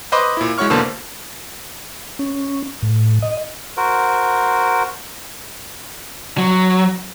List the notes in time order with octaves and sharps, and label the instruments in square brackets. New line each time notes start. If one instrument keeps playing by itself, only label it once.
[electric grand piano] B4 C5 D#5 B5 C6 D6
A#2 E4
G#3 E4 F#4 C#5 C#6 F6
E2 B2 D3 A#3 C5 A5
[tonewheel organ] C#4
A2
D#5
[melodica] F#4 A#4 C5
[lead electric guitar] F#3